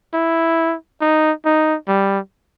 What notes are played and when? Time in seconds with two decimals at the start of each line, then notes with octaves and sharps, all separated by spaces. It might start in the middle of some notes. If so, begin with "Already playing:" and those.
0.14 E4
1.01 D#4
1.46 D#4
1.88 G3